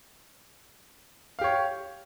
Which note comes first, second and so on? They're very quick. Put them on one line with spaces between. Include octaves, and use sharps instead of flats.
F5 G4 C#5